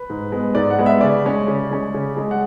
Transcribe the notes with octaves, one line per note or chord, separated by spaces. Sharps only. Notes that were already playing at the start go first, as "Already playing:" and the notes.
Already playing: B4
G#2
G#3 B3
G#2 D5
F#5
G#3 B3
E5
C#3 D5
G#3 C#4
C#3
G#3 C#4
C#3
G#3 C#4
F#5